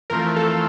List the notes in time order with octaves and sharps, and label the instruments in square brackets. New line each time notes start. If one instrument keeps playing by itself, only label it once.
[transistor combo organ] F2 E3 A3 C4 F4 [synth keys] A#4
[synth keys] A4